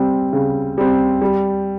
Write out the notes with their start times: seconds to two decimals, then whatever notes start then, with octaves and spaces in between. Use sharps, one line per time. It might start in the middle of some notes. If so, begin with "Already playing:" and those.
Already playing: G3 C4
0.33 C#3
0.78 G3 C4
1.22 G3